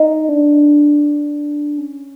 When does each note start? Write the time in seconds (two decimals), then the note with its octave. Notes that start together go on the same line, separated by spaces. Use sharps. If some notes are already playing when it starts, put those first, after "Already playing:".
Already playing: D#4
0.29 D4
1.78 C#4